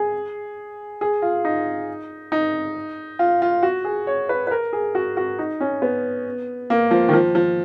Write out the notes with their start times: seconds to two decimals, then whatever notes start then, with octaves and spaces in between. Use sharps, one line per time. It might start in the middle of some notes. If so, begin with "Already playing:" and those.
Already playing: G#4
1.01 G#4
1.22 F4
1.45 D#4
2.32 D#4
3.19 F4
3.42 F4
3.63 F#4
3.85 G#4
4.07 C#5
4.29 B4
4.47 B4
4.51 A#4
4.73 G#4
4.95 F#4
5.17 F#4
5.39 D#4
5.61 C#4
5.82 B3
6.70 A#3
6.91 F3
7.09 D#3
7.13 F3
7.35 F3